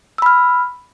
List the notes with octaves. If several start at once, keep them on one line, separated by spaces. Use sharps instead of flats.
B5 E6 F6